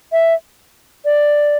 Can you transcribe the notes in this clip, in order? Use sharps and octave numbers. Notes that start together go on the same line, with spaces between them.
E5
D5